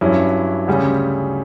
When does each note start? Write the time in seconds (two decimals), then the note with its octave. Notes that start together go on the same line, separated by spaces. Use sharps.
0.01 G2 F#3 C#4 E4
0.68 D2 C#3 G3 C#4